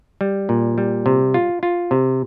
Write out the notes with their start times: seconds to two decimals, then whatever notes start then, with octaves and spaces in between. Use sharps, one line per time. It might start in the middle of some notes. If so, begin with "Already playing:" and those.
0.21 G3
0.49 A#2
0.78 G3
1.06 C3
1.34 F4
1.63 F4
1.91 C3